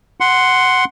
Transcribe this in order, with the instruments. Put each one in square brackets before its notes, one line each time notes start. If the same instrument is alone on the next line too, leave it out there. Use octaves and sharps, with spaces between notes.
[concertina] F#5 C6